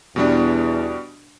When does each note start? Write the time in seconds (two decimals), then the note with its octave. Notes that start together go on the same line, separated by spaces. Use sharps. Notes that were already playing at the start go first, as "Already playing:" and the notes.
0.16 E2 B2 G3 D4